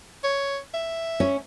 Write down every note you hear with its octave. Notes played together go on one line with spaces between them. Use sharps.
C#5
E5
C#4